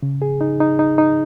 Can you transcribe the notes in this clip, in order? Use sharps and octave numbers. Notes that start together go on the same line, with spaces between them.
C#3
G#4
D#4
D#4
D#4
D#4